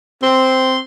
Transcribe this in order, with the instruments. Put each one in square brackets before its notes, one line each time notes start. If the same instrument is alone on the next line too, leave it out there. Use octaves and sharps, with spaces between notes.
[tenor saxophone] C4 [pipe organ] C6